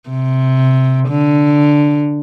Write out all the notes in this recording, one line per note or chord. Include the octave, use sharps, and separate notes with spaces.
C3
D3